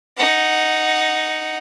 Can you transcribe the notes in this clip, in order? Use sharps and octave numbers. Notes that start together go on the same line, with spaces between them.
D#4 F#5